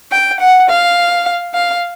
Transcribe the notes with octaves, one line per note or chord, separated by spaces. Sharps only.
G5
F#5
F5
F5